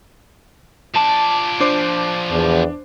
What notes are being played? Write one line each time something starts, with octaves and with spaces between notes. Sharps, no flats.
F3 D5 A5
D4 C5 D6 C7
E2